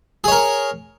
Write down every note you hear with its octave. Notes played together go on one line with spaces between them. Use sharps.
G#4 A#4 C#5